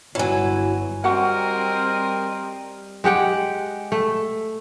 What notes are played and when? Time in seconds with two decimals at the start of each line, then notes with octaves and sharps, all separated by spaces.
0.15 G1 E3 F#3 C#5 G#5
1.04 G3 C4 F#4 A#4 D#5 F#5
3.04 G#3 G4 F#5 G5
3.92 A3